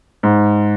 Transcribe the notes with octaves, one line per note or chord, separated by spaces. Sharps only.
G#2